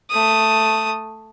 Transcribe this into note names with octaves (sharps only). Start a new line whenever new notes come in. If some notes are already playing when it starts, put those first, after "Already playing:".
A3 D#6